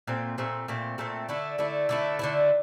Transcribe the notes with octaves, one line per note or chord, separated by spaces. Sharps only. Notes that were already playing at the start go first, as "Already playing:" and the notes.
A#2 A3 C4
A#2 A3 C4
A#2 A3 C4
A#2 A3 C4
D3 A3 E4
D3 A3 E4
D3 A3 E4
D3 A3 E4